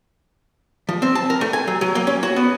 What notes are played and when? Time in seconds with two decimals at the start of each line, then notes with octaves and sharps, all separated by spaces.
0.89 F3
1.02 C4
1.15 A5
1.30 A#4
1.41 A3
1.53 G#5
1.67 F#3
1.81 F#3
1.95 A#3
2.07 C#4
2.23 F#4
2.36 B3